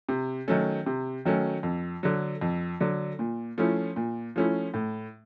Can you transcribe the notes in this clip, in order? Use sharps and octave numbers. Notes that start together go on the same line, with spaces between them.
C3
D#3 F#3 A3 C#4
C3
D#3 F#3 A3 C#4
F2
D3 F#3
F2
D3 F#3
A#2
F3 A3 C#4 E4
A#2
F3 A3 C#4 E4
A2